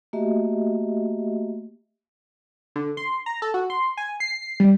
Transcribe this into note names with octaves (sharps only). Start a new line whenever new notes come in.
A3 A#3 F#4 G4 D#5 E5
D3
C6
A#5
A4
F#4
C6
G#5
C7
G3